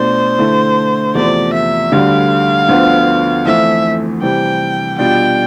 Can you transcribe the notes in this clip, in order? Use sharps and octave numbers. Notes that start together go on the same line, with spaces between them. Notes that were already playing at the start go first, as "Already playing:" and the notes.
Already playing: B2 A3 D4 F4 C5
D3 A3 E4
E2 C3 F3 A3 D5
E5
D2 D3 G3 F5
D2 D3 F3 B3
F2 E3 A3 E5
C3 E3 G3 G5
B2 G3 D4 F4 G5